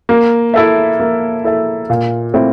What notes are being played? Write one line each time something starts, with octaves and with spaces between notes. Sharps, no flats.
A#3
E4 A4 E5
A#3
E4 A4 E5
A#2
A3 C4 E4